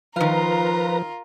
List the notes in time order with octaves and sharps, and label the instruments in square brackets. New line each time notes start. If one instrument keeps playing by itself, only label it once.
[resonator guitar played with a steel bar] D#3 F5 [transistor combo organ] F3 [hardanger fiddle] F4 A#4 [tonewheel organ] B4 A#5